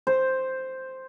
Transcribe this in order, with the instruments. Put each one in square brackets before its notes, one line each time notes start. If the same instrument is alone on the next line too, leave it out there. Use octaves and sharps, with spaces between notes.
[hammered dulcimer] C5